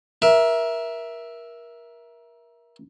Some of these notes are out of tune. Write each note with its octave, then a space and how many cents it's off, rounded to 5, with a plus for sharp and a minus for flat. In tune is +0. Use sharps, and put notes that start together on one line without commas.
A#4 +25 E5 +0